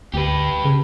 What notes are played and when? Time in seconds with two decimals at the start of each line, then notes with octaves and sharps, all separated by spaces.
0.14 D2 G4 B4
0.65 C#3